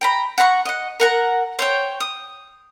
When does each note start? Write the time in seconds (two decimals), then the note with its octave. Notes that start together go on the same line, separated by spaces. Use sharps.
0.01 G5 A#5 B5
0.38 F#5 A#5 B5 C#6
0.65 D#5 F#5
1.00 A#4 F#5 A#5
1.59 C5 C#5 G5
2.00 D#6